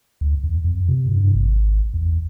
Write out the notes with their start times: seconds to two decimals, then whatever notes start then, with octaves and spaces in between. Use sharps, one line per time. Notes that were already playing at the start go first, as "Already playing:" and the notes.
0.21 D2
0.44 E2
0.64 F2
0.88 C3
1.08 G2
1.35 G#1
1.94 E2